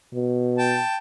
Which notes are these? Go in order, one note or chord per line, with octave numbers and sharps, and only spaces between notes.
B2
G5 A5